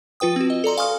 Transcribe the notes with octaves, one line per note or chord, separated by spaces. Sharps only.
F3 F4 B4 G5 D#6
C4 F#4
D#5
A4 D5 A#5 C6
F5 G#5 C6 C#6 D#6 F6